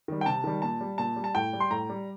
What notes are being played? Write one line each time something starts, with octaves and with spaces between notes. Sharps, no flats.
D#3 G3
G5
C3 A5
D#3 G3
A#2 A5
G3
A#2 A5
G3
A5
A2 G5
G3
C6
A2 A#5
G3